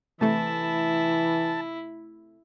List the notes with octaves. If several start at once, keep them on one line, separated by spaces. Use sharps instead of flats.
C3 E3 A3 E4 A5